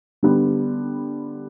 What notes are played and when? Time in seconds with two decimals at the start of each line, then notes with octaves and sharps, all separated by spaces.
0.23 D3 G3 B3